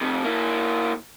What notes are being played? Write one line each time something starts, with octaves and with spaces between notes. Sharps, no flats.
F2 C3
A#3 E4